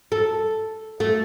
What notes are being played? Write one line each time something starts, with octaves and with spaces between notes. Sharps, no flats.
A4
A3